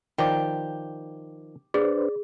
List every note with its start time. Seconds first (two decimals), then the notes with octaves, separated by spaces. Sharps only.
0.18 D#3 F3 G4 D5
1.74 D4 G#4 B4 C5 D5